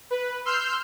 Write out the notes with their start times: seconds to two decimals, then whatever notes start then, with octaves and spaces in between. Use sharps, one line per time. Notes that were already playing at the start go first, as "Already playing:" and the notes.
0.11 B4
0.45 C6 E6 F6 G6 C7